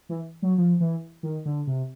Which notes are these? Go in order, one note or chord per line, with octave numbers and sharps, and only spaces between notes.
E3
F#3
F3
E3
D#3
D3
C3